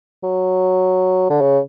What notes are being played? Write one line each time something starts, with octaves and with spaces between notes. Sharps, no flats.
F#3
D3
C#3